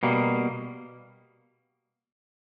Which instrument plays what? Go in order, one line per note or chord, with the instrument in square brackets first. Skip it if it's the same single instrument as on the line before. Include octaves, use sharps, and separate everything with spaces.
[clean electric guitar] B2 G3 A#3